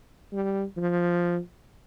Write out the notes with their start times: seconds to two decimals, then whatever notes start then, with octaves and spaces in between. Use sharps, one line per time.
0.33 G3
0.77 F3